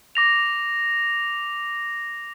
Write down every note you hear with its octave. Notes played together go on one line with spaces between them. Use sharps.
D6 A#6 F7